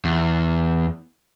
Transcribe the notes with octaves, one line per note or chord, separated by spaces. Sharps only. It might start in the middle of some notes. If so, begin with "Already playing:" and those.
E2